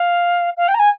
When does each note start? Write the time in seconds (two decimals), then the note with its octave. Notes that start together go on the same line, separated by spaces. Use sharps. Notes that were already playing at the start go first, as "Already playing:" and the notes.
Already playing: F5
0.56 F5
0.67 G5
0.74 A#5
0.79 G#5